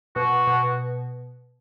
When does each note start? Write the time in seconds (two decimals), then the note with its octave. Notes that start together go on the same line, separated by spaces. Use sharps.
0.16 B2 F#4
0.47 B2